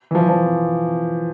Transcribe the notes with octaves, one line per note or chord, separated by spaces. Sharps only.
E3
F3
F3